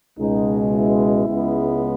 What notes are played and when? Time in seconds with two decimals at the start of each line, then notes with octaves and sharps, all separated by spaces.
0.17 C#2 B2 G#3 D#4
0.73 E4
1.28 C#2 C#3 G#3 B3